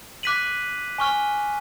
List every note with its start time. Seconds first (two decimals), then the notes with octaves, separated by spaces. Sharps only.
0.23 D6 F#6 B6 D#7 F#7
0.98 G#5 C#6 F6